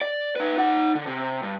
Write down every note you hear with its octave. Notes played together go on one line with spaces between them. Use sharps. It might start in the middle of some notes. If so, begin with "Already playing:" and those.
D5
D#4 B4
D#4 F#5
D3
C3
G2